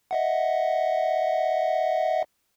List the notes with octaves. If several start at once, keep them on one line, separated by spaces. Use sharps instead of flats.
D#5 E5 F#5